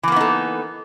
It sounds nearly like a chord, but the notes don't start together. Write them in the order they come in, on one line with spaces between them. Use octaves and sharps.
E3 A#3 B3 D#4 A4